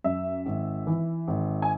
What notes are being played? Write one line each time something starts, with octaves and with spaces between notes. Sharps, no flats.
F#2 E5
G#1
E3
G#1
G#5